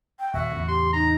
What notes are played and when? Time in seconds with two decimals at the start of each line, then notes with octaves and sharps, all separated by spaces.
0.20 G5
0.34 D#1 F#4 E5
0.52 E2 A2 C#3
0.68 G4 C6
0.93 D#4 A#5